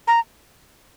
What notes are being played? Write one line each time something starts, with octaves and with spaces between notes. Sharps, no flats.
A#5